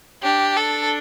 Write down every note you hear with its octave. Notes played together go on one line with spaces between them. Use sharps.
D4 G4
A4